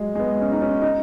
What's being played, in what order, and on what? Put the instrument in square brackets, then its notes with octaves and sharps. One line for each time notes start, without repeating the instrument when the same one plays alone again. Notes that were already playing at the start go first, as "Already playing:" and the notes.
Already playing: [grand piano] F#3 G#3
G#3
B3
C#4
D#4
C#4
D#4